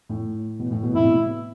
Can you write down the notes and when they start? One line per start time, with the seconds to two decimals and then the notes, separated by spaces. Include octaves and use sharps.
0.09 A2
0.59 B2
0.71 A2
0.83 B2
0.93 A2 C3 E4
1.05 B2